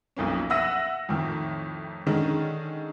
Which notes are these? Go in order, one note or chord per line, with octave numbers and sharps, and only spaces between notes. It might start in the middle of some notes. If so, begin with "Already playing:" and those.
B1 F2 A#3 C#4
E5 F#5 E6 A#6 D#7
F2 A2 D#3
D3 D#3 G#3 C#4 D#4